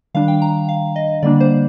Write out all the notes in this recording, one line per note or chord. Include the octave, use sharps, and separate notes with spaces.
D#3 G3 D4 F5
G5
A#5
F5
D#5
D3 G3 A#3 D4 D5
C5